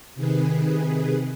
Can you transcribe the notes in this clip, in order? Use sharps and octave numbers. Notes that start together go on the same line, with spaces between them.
C3 D#3 G#4 B4